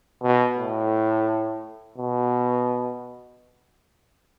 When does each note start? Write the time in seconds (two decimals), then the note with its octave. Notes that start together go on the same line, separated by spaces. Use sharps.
0.23 B2
0.58 A2
1.98 B2